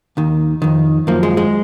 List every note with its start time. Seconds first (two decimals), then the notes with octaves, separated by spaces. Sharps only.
0.17 D#2 D#3
0.62 F2 D#3
1.07 F#2 F3 A#3
1.23 G#3
1.37 G#3